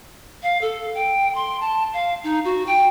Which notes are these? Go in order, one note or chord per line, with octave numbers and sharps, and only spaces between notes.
F5
A4
G5
C6
A5
F5
D#4
F#4
G5